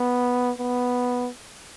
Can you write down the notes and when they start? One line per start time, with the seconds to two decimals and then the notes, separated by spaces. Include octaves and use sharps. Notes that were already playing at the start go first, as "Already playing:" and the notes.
Already playing: B3
0.59 B3